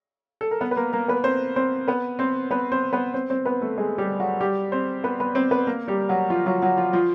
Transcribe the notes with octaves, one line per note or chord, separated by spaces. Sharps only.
A4
A#4
B3 B4
B4
A#3 A#4
A#3 A#4
B3 B4
C4 C5
C4 C5
B3 B4
C4 C5
B3 B4
C4 C5
B3 B4
C4 C5
C4 C5
B3 B4
A3 A4
G#3 G#4
G3 G4
F#3 F#4
G3 G4
C4 C5
B3 B4
B3 B4
C4 C5
B3 B4
A#3 A#4
G3 G4
F#3 F#4
F3 F4
F#3 F#4
F#3 F#4
F3 F4
F3 F4